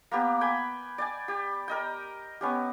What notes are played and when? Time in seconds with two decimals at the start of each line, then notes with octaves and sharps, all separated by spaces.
0.11 A#3 B3 G4
0.41 G5 G#5 B5
0.98 D5 G5 G#5
1.28 G4
1.68 A#4 D#5 G5
2.41 B3 C#4 G4